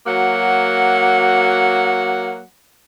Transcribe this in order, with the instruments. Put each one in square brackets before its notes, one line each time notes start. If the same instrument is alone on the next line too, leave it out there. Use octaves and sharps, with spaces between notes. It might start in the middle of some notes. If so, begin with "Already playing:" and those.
[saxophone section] F#3 A#3 F#4 F#5